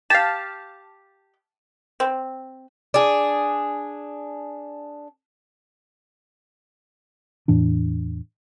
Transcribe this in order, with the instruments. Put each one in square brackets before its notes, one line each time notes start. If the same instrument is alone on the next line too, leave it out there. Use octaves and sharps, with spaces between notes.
[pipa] G4 [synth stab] F5 A5
[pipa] C4
[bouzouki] D4 G#4
[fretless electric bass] E2 A2 E3 D4